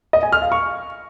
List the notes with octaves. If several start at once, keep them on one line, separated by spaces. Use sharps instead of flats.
D#5
G#5
F6
F5
C#6